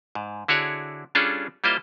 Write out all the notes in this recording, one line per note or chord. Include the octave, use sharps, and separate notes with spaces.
G#2
D3 E4 F#4 G#4 C#5 D5
G3 C#4 D4 F4 G#4 A4
G3 A#3 E4 F4 C5 D#5